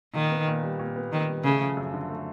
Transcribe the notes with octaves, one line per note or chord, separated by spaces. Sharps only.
A#2 D#3
B3
A#2
G3
A#2
B3
A#2 D#3
G3
C#3 A3
F3
F#2
D3
A3